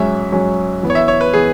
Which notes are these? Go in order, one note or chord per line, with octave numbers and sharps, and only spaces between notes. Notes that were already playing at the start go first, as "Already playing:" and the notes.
Already playing: G#2 F#3 C#4 E5
G#2 F#3 C#4
E2 E3 B3
C#5
E5
C#5
B4
E3 B3 G#4